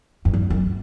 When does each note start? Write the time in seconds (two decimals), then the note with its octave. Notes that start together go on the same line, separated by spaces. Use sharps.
0.25 F#2
0.33 G2
0.50 F#2